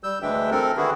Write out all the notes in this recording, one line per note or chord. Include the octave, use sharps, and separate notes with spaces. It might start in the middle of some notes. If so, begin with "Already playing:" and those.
G3 E6 G6
D2 E3 G#3 D4 E5 G5
C4 A4 A#4
D3 E3 E4 F#4 G#4